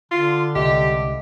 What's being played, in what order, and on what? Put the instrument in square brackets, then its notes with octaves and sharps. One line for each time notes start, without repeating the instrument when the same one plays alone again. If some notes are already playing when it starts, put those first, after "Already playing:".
[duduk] D3 [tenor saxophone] F4
[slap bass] C2 G#3 [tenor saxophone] G4 [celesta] D#5 E5